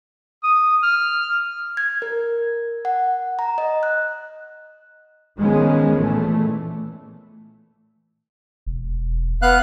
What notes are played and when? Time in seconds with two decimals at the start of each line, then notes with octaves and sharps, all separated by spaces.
0.43 D#6
0.83 F6
1.77 G#6
2.02 A#4
2.85 F#5
3.39 A#5
3.58 D#5
3.83 F#6
5.38 D#3 F3 G#3 B3 C#4
5.99 A#2 E3 A3
8.66 E1
9.42 B3 F5 F#6